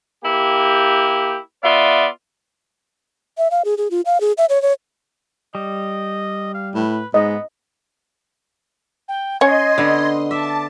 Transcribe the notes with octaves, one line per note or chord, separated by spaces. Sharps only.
A#3 E4 G4
B3 F4 D5 E5
E5
F5
G#4
G#4
F4
F5
G#4
E5
C#5
C#5
G3 D#5
F5
A2 B4
G#2 B3 D#5
G5
C#4 C#5 D#5 C6 G#6
D3 B3
E5 A5 D6